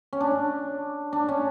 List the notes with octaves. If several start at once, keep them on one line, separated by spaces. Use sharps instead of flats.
C#4
D4
D4
C#4